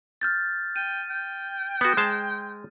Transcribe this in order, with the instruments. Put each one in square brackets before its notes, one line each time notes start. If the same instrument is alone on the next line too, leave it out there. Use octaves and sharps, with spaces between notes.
[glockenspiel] F6 G6 A6
[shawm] G5 [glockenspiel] D#7
[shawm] G5
[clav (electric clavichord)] B3 F#4
G#3 C5 A5